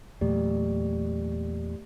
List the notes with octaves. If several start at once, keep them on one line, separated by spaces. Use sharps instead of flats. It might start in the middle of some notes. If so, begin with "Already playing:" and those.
E2 A#2 F#3 A3 G4 D5